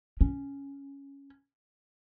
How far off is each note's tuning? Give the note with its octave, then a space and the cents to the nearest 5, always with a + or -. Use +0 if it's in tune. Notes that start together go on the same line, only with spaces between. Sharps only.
C#4 +5